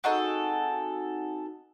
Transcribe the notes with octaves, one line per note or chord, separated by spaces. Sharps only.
C4 D#4 F#4 G#4 A4 F#5